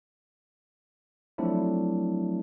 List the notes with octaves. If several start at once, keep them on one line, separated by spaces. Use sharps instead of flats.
F3 F#3 A3 C4 D4 E4